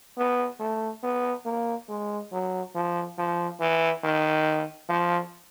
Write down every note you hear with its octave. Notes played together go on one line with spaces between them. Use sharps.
B3
A3
B3
A#3
G#3
F#3
F3
F3
E3
D#3
F3